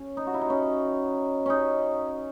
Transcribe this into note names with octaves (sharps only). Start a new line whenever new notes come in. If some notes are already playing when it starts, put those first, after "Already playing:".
Already playing: C#4
D#4
F#4
E4
D#4
C#4
C#4 D#4